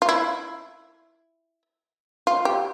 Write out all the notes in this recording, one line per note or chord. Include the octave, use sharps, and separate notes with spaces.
F4
E4
F4
G4